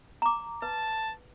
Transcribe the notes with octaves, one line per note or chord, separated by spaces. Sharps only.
A#5 D6
B4 A5